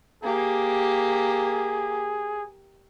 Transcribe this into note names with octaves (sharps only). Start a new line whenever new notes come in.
A#3 G4 G#4